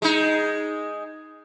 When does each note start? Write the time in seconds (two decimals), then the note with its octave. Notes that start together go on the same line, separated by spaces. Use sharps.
0.02 G#3 D#4